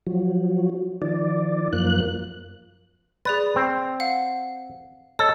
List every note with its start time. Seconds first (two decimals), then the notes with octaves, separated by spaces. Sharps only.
0.07 F3 F#3
1.02 D#3 F3 D5
1.73 F#2 F3 A#3 F#6
3.25 G#4 B4 D5 A6
3.56 C4
4.00 F5 F#5
5.19 A4 C#5 D#5